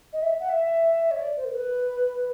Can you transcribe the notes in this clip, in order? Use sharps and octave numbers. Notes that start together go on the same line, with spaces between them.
D#5
E5
F#5
E5
C#5
D5
C5
A#4
B4